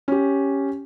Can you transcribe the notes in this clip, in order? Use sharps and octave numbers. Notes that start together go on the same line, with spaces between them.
C#4 G4